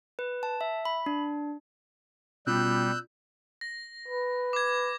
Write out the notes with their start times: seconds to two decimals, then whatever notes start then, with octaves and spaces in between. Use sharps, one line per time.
0.19 B4
0.43 A5
0.61 E5
0.85 B5
1.06 D4
2.47 B2 G3 C#4 F4 E6 F#6 G6
3.61 A#6
4.08 B4
4.53 D6 G#6